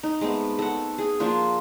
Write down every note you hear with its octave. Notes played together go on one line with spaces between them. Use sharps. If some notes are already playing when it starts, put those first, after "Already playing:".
D#4
G#3 A3 B3 C4
A4 F#5
G#4
F3 A#3 D4 F4